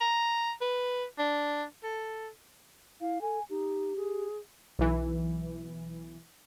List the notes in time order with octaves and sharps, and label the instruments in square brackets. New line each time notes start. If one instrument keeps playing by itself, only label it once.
[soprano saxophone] A#5
B4
D4
A4
[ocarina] E4 [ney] F5
[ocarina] A4 [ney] G#5
[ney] D#4 [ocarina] G4
[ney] G#4
[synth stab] B1 E3